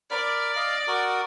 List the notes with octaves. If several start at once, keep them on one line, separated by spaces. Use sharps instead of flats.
A#4 D5 B5 F6
D#5 F5
F#4 A#4 D#6